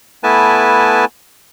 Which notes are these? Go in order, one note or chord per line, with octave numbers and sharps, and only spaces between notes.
A3 B3 E4 B4 G#5 A5